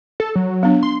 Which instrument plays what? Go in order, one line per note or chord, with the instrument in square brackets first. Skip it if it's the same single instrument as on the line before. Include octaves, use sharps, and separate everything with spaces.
[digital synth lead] A4
F#3
[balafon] B3 D4
[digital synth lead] C6